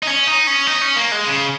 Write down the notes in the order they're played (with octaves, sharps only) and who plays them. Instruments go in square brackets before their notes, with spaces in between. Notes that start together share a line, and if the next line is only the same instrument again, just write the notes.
[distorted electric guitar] D#4
C#4
D#4
C#4
D#4
C#4
A#3
G#3
C#3